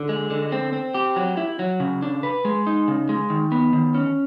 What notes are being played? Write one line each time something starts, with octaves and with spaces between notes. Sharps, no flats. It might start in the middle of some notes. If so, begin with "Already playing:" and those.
Already playing: D3
G#3
D3
C4
C4
G4
F#3
E4
F#3
C#3
D4
B4
G#3
D#4
C#3
G#3
D#3
B3
D#3
C#4